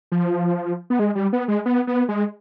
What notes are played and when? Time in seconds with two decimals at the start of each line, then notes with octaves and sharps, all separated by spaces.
0.12 F3
0.90 B3
0.99 G#3
1.15 G3
1.33 B3
1.48 G#3
1.66 B3
1.87 B3
2.09 G#3